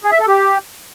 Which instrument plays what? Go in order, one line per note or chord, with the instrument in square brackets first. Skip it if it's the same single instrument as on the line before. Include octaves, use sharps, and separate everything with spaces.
[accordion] G#4
E5
A4
G4